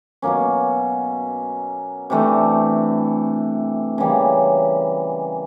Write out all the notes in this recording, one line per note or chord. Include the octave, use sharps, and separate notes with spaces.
B2 F#3 A#3 C#4
C3 E3 A3 D4
C#3 E3 G3 A#3